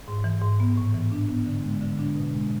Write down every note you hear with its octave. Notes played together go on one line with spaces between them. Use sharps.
G#2
E3
G#2
B3
A2
E3
D4
B3
D3
G#3
D3
D4
B2
G#3